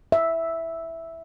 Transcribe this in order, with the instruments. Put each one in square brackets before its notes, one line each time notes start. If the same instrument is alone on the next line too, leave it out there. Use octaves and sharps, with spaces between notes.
[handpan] E5